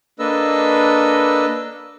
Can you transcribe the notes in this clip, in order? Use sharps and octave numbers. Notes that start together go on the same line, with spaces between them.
A#3 D4 A4 B4 D#5 E6